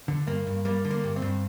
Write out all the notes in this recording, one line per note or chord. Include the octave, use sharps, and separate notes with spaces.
D3
G2 A#3
G2
G3 A#3
D3
A#3
G2
C4
G2